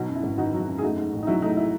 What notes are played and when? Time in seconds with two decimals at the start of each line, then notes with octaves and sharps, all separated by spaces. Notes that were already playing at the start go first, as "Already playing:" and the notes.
Already playing: B2 F#3 D#4 F#4
0.09 F#2
0.16 E4
0.23 G#1
0.38 D#3 D#4 F#4
0.54 F#3
0.68 F#2
0.78 G#4
0.82 A3 D#4 F#4
0.97 G#2
1.13 A1
1.23 D#4
1.27 F#3 E4
1.42 A3 D#4
1.57 E4